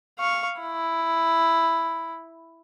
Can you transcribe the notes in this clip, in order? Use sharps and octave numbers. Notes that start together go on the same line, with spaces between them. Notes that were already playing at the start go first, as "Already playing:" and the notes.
F5 C#6
E4